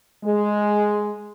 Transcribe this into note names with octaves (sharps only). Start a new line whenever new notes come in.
G#3